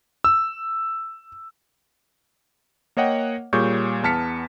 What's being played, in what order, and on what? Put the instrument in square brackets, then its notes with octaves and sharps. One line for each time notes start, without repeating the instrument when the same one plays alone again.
[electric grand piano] E6
A#3 C#5 D#5 F#5 G5
A#2 G3 G#4 C#5 C#6 G6
E2 B3 A5 F6 B6 C#7